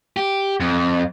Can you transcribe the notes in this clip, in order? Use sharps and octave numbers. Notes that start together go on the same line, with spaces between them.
G4
F2